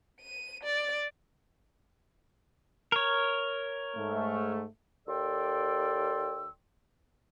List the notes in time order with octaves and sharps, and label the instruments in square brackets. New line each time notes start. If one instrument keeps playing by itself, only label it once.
[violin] D#7
D5
[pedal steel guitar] A#4 C#5
[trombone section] G#2 A3
[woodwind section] D#2 A4 D5 G5 C6 E6